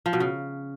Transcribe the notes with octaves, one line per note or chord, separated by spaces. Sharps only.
F3
B2
C#3